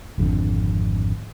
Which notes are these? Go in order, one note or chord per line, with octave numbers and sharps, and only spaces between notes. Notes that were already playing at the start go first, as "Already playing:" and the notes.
G#1 F2 D3